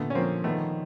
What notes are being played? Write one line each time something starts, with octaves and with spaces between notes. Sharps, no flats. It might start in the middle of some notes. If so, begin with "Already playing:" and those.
Already playing: A#2 D3 A3 B3
C#4
F3 A#3 C4
D#3 A3 B3